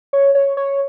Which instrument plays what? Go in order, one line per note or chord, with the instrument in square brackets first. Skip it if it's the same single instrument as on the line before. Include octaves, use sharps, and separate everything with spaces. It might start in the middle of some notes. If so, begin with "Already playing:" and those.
[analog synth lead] C#5
C#5
C#5